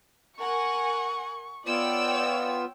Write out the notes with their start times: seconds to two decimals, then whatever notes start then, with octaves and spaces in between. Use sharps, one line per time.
0.39 A#4 F#5 G#5 C#6
1.67 B3 F4 C#5 D5 G5 E6